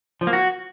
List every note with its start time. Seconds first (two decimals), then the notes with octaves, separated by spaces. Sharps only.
0.21 F3
0.27 A#3
0.33 F#4